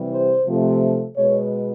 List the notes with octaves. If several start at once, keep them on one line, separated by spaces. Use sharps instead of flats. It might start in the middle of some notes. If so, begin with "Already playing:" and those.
Already playing: C3 E3 G3
C5
C3 F3 A3
B2 G#3 B3 C#5